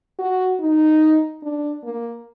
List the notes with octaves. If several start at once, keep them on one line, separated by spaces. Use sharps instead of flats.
F#4
D#4
D4
A#3